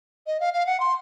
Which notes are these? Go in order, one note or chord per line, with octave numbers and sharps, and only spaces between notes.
D#5
F5
F5
F#5
C6